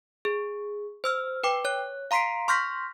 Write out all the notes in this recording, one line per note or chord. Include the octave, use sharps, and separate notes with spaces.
G#4
C5 E6 F6
B4 G5 D6
C#5 F#6
F5 A#5 C6 B6 C7 D7
C6 C#6 F6 G6 A#6 B6